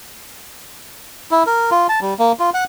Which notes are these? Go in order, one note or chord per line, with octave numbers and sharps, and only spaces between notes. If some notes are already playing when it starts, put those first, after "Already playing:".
E4
A#4
F4
A5
G3
A#3
F4
F#5